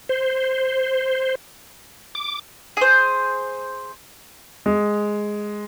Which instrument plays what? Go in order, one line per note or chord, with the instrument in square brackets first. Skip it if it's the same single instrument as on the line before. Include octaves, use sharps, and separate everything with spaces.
[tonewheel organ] C5
D6
[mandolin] G#4 C5
[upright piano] G#3